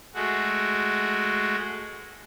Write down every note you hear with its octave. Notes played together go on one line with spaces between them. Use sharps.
G#3 A3 F#4